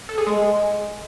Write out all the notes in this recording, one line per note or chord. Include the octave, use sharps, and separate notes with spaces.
A4
G#4
G#3